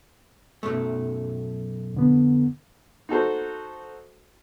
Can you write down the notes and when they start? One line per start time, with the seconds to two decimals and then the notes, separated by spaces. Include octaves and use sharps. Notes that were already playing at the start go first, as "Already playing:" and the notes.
0.63 B1 F#2 A3
1.94 F2 D3 B3
3.09 D#4 F#4 A4 C5